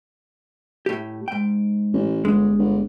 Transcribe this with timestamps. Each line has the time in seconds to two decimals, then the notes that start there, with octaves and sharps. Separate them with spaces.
0.86 A2 G4
1.28 G#2 G5
1.93 A1
2.25 G1 G#3
2.58 G1